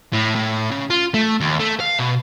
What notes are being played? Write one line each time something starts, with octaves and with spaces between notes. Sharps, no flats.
A2
A2
C#3
F4
A3
D#2
A3
F5
B2